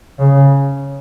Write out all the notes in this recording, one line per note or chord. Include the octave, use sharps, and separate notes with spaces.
C#3